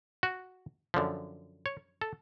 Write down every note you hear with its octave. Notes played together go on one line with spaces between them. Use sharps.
F#4
F#2 D3 F3
C#5
A4